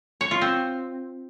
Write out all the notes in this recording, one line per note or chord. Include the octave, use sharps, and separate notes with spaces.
C#5
F4
C4